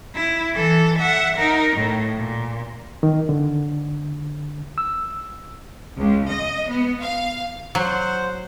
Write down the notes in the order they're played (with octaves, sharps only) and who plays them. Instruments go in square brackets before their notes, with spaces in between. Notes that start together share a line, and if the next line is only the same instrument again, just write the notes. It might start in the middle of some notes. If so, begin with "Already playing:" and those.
[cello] E4
E3 A4
E5 F#5
D#4 A#4
A2
A#2
[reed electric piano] D#3
D3
E6
[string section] C#2
D#5
B3
F5
[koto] F#3 [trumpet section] C5 F#5